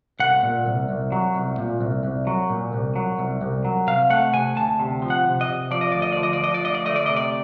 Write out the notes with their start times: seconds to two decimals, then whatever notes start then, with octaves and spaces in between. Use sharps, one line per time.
0.19 C2 F#5
0.43 A#2
0.66 C2
0.89 C2
1.12 F#3
1.35 C2
1.58 A#2
1.81 C2
2.03 C2
2.27 F#3
2.50 A#2
2.73 C2
2.96 F#3
3.19 C2
3.41 C2
3.65 F#3
3.87 C3 F5
4.10 A3 F#5
4.33 C3 G#5
4.56 D2 A5
4.79 C3
5.02 F3
5.10 F#5
5.25 C3
5.41 D#5
5.48 C3
5.71 F3 D5
5.81 D#5
5.92 D2 D5
6.02 D#5
6.13 F3 D5
6.23 D#5
6.33 D5
6.40 F3 D#5
6.54 D5
6.63 D2 D#5
6.75 D5
6.85 A3 D#5
6.96 D5
7.06 C3 D#5
7.16 D5